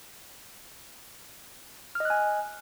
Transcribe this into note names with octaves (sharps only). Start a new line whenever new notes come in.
D#5 G#5 F6 F#6